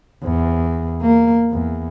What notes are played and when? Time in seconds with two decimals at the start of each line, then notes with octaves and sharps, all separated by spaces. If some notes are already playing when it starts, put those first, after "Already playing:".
0.24 E2
1.01 A#3
1.51 E2